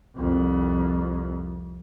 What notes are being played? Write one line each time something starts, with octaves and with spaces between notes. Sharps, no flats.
C2 F2